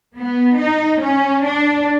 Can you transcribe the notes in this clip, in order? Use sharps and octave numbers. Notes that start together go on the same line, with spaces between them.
B3
D#4
C#4
D4